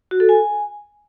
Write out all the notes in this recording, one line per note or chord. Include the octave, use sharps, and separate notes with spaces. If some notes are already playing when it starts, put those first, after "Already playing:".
F#4
A4
G#5